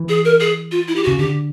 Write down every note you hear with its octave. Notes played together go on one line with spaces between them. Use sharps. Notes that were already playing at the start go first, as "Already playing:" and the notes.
Already playing: E3
G#4
A#4
G#4
F4
E4
G4
F#4
C#3
D3 G4